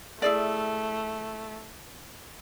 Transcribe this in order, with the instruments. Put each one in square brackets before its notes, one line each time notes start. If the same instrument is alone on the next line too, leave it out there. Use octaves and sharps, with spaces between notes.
[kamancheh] A3 [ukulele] E4 G#4 D5